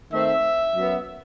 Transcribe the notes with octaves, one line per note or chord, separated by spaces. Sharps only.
D#3 A3 C4 E5
F#2 F#3 B3